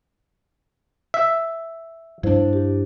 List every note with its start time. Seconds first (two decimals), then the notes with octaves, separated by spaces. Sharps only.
1.14 E5
2.23 G2 F3 D4 E4 C5
2.53 G4